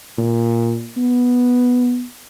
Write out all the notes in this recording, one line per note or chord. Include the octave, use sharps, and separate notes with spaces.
A#2
B3